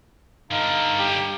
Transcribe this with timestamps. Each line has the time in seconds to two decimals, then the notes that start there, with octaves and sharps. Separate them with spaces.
0.51 G2 D3 D#4 F5
0.99 G4